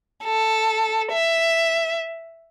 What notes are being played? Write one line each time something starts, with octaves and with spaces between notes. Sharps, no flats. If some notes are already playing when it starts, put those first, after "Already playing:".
A4
E5